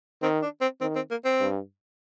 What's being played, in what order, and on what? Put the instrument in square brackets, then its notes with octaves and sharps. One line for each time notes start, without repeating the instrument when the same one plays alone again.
[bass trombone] D#3 [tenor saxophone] C4
[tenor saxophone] D4
C4
[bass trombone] D#3 [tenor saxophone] C4
[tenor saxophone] C4
A#3
C4
[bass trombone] G2